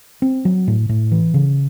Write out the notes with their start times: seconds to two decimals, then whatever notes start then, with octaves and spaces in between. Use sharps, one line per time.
0.22 C4
0.45 F#3
0.68 A2
0.89 A2
1.11 E3
1.34 C#3